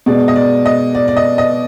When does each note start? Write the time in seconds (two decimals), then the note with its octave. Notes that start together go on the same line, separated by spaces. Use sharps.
0.06 B2 G#3 D5
0.28 D#5
0.36 D5
0.66 D#5
0.95 D5
1.08 D5
1.17 D#5
1.38 D#5